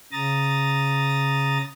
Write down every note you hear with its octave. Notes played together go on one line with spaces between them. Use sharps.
C#3 A#5 D#6 A6